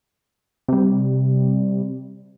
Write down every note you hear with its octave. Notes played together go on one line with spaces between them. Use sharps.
C3 G3